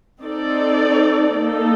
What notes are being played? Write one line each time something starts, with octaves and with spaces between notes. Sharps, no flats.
C4 D#4 A4 D5
A#3 D#4 A4